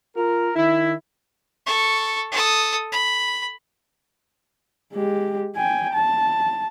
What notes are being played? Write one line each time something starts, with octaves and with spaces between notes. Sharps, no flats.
F4 A#4
D#3 E4
A4 C#6
A4 D#6
B5
G#3 G4
G5 G#5
A5